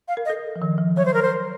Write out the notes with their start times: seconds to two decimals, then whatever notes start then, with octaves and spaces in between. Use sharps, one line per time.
0.08 F5
0.17 A#4
0.25 D#5
0.30 A4
0.56 F3
0.62 D#3
0.78 F3
0.97 F#3 C#5
1.05 C5
1.14 A#4
1.22 C5